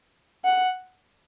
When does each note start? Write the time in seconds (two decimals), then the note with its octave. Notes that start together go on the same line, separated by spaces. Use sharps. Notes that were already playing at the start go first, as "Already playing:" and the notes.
0.45 F#5